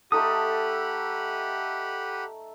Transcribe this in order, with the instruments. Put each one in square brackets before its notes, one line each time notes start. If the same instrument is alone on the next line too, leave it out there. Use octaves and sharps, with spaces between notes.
[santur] A3 D#4 A4 [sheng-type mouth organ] G4 F#5 B5 [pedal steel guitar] D#6